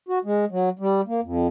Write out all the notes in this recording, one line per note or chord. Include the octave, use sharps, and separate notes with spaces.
F#4
G#3
F#3
G3
A#3
F2